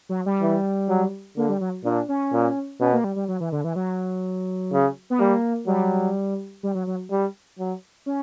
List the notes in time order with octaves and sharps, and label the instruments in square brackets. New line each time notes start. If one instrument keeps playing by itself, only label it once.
[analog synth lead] F#3
G3
[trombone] E3
F#3
[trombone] D3 [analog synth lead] A#3
[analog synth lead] G3
F#3
[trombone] A#2 [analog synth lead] D4
[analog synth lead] C#4
[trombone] A#2
[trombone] B2 [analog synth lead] C#4
[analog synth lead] A#3
G3
G3
F#3
E3
D3
E3
F#3
[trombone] C#3
[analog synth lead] B3
[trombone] G3 [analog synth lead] A#3
[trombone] F#3 [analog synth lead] G3
[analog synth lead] G3
F#3
F#3
[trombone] G3
F#3
[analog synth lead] C#4